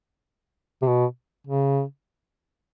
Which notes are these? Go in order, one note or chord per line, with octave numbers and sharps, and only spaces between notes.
C3
B2
C#3